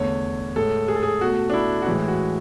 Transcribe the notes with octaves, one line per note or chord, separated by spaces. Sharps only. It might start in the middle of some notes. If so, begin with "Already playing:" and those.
Already playing: E2 D3 A3 C#5
A2 G#3 A4
G#4
A4
G#4
B2 A3 F#4
D4
E4
F#4
A2 E3 G#3 E4
F#4